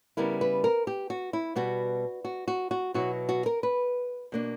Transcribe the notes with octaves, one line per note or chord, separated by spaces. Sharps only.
C#3 G3 B3 E4 A#4
B4
A#4
G4
F#4
E4
B2 G3 B3 F#4
F#4
F#4
F#4
B2 F#3 B3 E4 F#4
F#4
A#4
B4
B2 A#3 D4